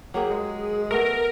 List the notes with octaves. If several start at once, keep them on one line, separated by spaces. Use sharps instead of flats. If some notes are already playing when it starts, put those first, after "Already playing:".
F#3 A#3 G4 G#4
G#3
A3 B3 A#4